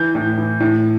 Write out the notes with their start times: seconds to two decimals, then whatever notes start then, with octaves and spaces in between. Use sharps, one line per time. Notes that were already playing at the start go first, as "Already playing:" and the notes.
Already playing: E3 G6
0.15 A2
0.37 E3
0.60 A2